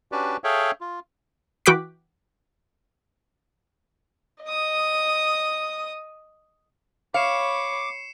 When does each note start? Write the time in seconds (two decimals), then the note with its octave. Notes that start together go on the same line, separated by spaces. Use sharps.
0.12 C#4 D4 F#4 G4 B4 D5
0.44 G#4 A4 C#5 E5 F5 G5
0.81 F4
1.66 E3 F#4 G5 D6 F#6 B6
4.44 D#5 D#6
7.14 C#5 F5 B5 D6 C7 C#7 E7